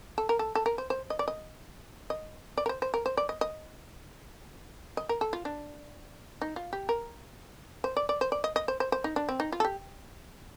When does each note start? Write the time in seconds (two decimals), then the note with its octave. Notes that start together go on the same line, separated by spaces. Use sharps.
0.18 A4
0.29 A#4
0.39 A4
0.55 A4
0.66 A#4
0.78 C5
0.90 C5
1.10 D#5
1.19 D5
1.28 D#5
2.10 D#5
2.57 D5
2.66 A#4
2.69 C5
2.82 C5
2.94 A#4
3.06 C5
3.17 D5
3.29 D#5
3.41 D#5
4.97 D#5
5.09 A#4
5.21 A4
5.33 F4
5.45 D4
6.41 D#4
6.56 F4
6.73 G4
6.89 A#4
7.84 C5
7.97 D5
8.09 D5
8.21 C5
8.32 D5
8.44 D#5
8.56 D#5
8.68 C5
8.80 C5
8.92 C5
9.04 D#4
9.16 D4
9.29 C4
9.40 D#4
9.52 F4
9.60 A4
9.65 G4